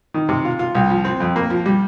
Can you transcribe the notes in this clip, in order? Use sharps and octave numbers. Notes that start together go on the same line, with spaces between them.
D#3
C3
F4
F4
C2
F3
C4
F2
A#3
F3
G3